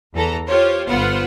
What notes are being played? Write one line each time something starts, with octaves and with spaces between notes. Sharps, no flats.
E2 E3 A4 A#5
F4 G4 C5 C#5
G1 B3 F4 B4 C5 F#5